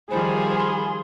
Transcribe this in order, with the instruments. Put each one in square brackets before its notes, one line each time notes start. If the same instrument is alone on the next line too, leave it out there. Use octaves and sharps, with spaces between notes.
[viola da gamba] D#3 F3 G3 [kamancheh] G#4 G#5 [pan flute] C5 [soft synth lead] B5
[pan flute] B5 [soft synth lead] C6